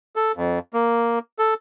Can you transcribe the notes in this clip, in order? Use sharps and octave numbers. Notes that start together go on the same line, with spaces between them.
A4
F2
A#3
A4